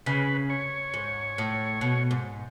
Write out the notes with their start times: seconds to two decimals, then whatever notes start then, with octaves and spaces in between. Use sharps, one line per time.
0.06 C#3 B4
0.50 C#5
0.94 G#2
1.38 A2
1.81 B2
2.11 G#2